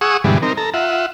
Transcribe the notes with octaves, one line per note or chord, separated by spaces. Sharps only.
G#4 F#5 C#6 D#6 E6
G2 B2 D3 E3 G3 G#3
C4 D#4 A#4
A4 A#5
F4 E5 F#5